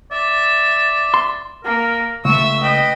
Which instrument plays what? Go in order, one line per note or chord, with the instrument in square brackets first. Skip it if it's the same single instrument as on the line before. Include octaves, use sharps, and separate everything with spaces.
[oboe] D5 [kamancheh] E5
[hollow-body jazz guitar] C6
[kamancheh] A#3 [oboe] A#4
[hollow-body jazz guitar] C#2 A3 [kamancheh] E5 E6 [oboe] C#6
[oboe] B4 [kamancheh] D#5 G5